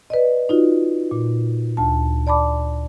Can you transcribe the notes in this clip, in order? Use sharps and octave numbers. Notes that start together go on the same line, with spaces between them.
B4 D5 D#5
D#4 F4 F#4
A#2
D2 A5
D5 A5 B5 D6